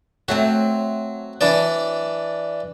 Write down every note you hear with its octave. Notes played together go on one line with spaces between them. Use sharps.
F#3 A3 C4 F#4
E3 D4 D5